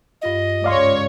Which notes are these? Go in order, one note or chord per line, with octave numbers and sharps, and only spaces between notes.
G2 F4 D#5 F5
C#2 G#2 G#3 C#5 D5 F5 C6